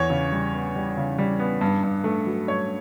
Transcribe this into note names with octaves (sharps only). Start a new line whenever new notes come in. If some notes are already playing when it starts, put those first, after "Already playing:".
Already playing: E2 C#5
C#3
G3
B3
G3
C#3
G3
B3
G2
G2
A3
F#3
G2 C#5